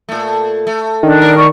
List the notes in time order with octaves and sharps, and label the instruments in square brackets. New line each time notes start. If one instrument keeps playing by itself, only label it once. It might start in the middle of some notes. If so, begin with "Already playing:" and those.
[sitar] A#2 A3
A3
[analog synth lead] D#3 [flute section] D4
[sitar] A2 A#4
[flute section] D5 C#6